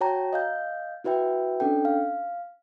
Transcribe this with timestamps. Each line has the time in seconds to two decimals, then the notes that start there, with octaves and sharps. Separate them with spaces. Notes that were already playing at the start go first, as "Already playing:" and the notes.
0.01 F#4 C#5 G5 A5 A#5
0.33 D#5 F5 G6
1.04 E4 F#4 B4 E5 G5
1.60 C#4 D4 A4 G5
1.85 F5